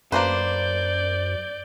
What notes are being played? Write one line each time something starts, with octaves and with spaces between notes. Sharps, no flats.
F#2 A#3 D4 B4 C5 D5 G6